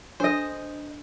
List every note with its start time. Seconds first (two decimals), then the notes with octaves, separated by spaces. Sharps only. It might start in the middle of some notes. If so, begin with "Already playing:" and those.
0.20 D4 A4 C5 D#5